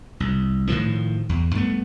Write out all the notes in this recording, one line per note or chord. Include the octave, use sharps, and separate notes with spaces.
C2
A2 D#3 F3
E2
G2 A3 B3